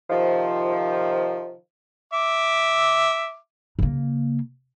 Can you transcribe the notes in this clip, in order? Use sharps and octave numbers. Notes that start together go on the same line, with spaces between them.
C3 D#3 F3
E5 D6
C#3 A#3